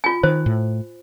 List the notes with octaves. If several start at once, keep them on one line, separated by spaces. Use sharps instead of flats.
F4 G#5
D#3 C5
A2